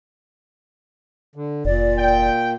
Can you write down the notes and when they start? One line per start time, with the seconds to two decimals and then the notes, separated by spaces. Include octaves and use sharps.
1.36 D3
1.65 F1 A#2 D5
1.98 G5